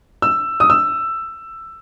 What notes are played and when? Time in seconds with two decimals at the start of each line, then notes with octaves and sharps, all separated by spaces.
0.22 E6
0.60 D#6
0.70 E6